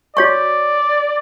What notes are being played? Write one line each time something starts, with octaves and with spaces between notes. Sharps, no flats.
F#4 C#5 D5 C#6